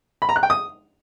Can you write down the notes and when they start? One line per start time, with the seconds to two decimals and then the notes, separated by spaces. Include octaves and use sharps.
0.22 B5
0.29 A#5
0.36 F#6
0.43 G5
0.50 D#6